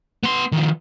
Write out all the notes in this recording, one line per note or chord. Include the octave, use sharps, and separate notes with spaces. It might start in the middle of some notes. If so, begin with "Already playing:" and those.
B3 C6
D#3 F3